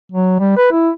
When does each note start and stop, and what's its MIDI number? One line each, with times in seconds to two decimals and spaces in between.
0.12 0.35 54
0.40 0.52 55
0.57 0.68 71
0.72 0.90 64